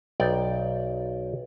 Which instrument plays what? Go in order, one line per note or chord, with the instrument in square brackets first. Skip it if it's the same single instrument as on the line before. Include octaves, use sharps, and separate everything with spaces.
[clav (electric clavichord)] B1 D5 G5